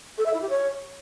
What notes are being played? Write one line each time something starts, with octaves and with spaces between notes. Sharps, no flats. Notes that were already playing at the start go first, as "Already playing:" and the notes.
A4
E5
E4
G4
C#5